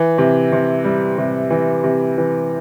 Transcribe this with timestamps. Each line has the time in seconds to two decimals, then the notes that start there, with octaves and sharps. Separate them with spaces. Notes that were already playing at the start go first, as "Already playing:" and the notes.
Already playing: E3
0.18 C3
0.52 C3
0.84 G3
1.18 C3
1.50 E3
1.84 C3
2.18 E3